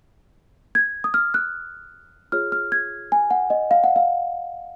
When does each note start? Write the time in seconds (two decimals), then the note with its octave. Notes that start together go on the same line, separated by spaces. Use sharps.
0.75 G#6
1.04 D#6
1.14 F6
1.34 F#6
2.32 F4 G#4 C#5 F6
2.52 F6
2.72 G#6
3.12 G#5
3.31 F#5
3.50 D#5
3.71 F5
3.84 F#5
3.96 F5